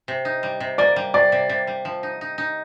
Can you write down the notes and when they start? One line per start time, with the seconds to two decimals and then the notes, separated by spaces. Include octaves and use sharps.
0.08 C3
0.25 D#4
0.43 G3
0.60 C3
0.78 A#3 D5
0.96 G3
1.14 C3 D5
1.32 C3
1.49 C3
1.67 G3
1.85 F3
2.03 D#4
2.21 D#4
2.38 D#4